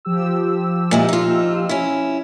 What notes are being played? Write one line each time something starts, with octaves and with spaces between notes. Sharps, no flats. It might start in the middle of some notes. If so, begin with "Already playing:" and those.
F3 G4 E6
A#2 G#3 E4
D#4 F4
C#4 E4